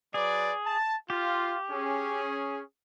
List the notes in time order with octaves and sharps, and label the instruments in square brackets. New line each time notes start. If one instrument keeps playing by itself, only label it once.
[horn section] F#3 B4 D5 [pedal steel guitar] G#4
[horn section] A5
[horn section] F4 [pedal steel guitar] G4
[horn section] C#4 G#4